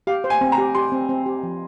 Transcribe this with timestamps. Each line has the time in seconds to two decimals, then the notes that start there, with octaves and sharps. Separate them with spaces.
0.07 G4 F5
0.24 C5
0.30 G#5
0.41 C4
0.52 A#5
0.58 G4
0.75 G4 C6
0.92 C4
1.09 C4
1.26 G4
1.43 F3